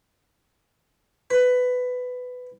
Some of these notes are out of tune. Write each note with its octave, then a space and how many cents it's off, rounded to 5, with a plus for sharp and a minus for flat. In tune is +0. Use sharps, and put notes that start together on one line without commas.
B4 +15